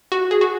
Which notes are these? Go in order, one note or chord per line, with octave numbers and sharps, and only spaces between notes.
F#4
G#4
F#4